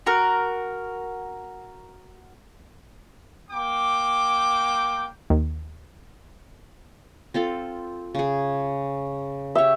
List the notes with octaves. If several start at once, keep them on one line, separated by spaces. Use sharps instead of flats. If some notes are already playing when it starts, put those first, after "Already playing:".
F#4 A#4
A#3 G5 D6
D#2
C4 F4 A4
C#3 G#4
G4 C#5 E5